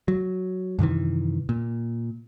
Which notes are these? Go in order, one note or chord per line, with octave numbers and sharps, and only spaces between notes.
F#3
F#2 C3 D#3 E3
A#2